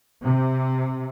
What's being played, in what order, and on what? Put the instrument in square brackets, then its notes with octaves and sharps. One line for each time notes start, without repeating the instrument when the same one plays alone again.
[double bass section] C3